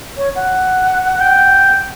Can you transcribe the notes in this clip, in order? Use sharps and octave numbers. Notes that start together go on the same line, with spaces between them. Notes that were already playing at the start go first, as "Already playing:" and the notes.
C#5
F#5
G5